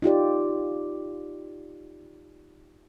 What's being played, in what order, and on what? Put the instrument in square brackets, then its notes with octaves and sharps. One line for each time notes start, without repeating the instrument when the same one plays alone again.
[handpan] D#4 F4 G4 D5